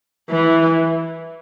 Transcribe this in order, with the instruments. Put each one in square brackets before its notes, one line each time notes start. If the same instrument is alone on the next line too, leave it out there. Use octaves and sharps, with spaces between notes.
[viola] E3